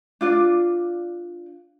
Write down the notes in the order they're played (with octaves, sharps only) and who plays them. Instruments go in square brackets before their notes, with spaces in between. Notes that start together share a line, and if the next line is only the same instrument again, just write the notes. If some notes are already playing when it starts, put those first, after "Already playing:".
[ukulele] D4 F4 D5